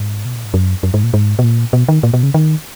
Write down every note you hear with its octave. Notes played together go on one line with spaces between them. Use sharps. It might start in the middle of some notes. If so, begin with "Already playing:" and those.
Already playing: G#2
B2
A#2
G#2
F#2
F#2
G#2
A#2
G#2
B2
A#2
B2
D#3
A#2
B2
C#3
D#3